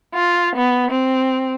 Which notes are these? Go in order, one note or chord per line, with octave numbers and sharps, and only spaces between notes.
F4
B3
C4